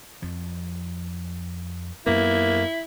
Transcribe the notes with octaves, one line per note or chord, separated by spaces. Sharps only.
F2 F3
F#2 A#3 B3 E4